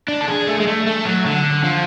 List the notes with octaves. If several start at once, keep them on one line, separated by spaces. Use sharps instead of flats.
D4
A4
G#4
A3
G#3
A3
A3
F#3
D3
F3